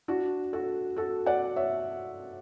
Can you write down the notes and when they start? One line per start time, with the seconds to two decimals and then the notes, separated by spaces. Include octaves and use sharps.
0.08 D4 F#4
0.53 F#4 A4
0.96 F#4 A4
1.26 D5 F#5
1.56 C#5 E5